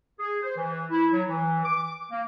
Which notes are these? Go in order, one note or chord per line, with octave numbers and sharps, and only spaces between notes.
G#4
C5
E3
E4
F#3
E3
D6
A#3